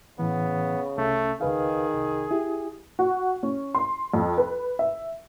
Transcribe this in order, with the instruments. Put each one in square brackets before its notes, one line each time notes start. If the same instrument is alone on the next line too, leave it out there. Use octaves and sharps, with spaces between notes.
[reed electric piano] A2 E3 [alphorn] C#3 [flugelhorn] B3
[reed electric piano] C2 C#4 [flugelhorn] A3
[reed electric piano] C#2 B4 F5 [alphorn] D#3 [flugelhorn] G#4
[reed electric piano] C2
E4 G4
[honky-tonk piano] F#4
C#4
C6
F2
B4
E5